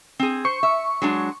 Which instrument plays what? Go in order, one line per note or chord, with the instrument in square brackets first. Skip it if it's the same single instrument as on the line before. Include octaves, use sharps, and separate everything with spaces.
[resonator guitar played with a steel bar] C4 G#4
[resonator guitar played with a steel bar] C5 [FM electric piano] C#6
[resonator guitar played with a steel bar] E5
F#3 G#3 D4